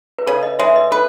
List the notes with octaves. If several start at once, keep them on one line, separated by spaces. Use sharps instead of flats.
B4
C#3 A4 C#5
B4 D#5
G#3 C#5 E5
B4 D#5
A4 B4